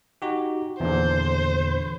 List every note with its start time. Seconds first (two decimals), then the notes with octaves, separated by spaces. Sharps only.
0.22 D#4 F#4 G4
0.80 E2 A#2 D3 C5